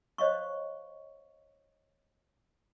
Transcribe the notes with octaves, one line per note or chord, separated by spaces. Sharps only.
C5 C#5 D#5 F5 C#6